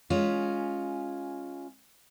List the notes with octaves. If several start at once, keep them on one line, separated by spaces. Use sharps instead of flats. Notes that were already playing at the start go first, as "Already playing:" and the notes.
G#3 C#4 F4